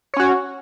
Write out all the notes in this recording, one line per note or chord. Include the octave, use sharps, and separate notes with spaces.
C#4 F#4 C#5